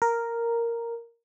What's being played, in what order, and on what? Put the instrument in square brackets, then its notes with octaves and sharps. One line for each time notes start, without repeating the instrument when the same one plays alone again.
[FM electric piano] A#4